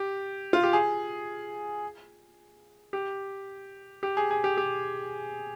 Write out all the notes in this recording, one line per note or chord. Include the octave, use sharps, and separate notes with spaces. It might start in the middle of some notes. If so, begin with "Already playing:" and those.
Already playing: G4
F4
G4
G#4
G4
G4
G#4
G#4
G4
G4